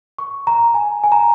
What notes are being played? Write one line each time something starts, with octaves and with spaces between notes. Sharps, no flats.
C#6
A#5
G#5
G#5
A#5